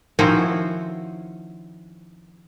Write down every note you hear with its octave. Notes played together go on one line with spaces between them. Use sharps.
D#3 F3 C4 C#4 E4 F#4